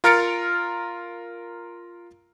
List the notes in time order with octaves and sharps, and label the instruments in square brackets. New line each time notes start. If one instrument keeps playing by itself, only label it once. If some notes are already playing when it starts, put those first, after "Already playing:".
[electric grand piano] F4 A#4 F6 A6 C#7 D7